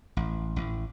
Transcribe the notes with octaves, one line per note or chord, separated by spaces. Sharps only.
A1
A1